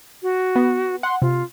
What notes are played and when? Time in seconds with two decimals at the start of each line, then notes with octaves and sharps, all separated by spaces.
0.23 F#4
0.56 B3
1.03 F#5 C6
1.22 C3 F4